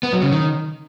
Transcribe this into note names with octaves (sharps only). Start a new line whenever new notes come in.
B3
F#3
C#3
D#3